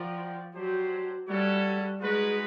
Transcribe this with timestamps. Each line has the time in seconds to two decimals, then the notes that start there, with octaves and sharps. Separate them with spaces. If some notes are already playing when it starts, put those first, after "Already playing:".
Already playing: F3 F#4 A#4 D5 G5
0.55 F#3 D4 G4 C5
1.28 G3 C#4 E4 A4 C#5 F#5
2.01 G#3 D#4 F#4 B4